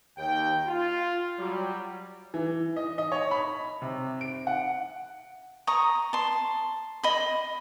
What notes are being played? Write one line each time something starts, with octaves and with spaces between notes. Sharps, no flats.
D#2 G5
F4
F#3 G3
E3
D#5
D#5
C#5
B5
C3
D7
F#5
A#5 C#6 D#6
A5 C6
D#5 B5